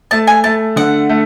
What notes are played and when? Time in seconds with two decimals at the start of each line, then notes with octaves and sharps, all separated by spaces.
0.11 A3 A5
0.27 G#5
0.44 A3 A5
0.76 D3 F#5
1.09 A3